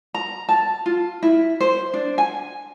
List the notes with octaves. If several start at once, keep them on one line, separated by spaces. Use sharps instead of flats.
A#5
A5
F4
E4
C5
D4
G#5